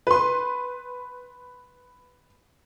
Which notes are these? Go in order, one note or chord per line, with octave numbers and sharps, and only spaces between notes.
B4 C6